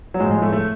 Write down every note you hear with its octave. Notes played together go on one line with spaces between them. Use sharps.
F#3
A2 F3 G#3
G#3
A3
A3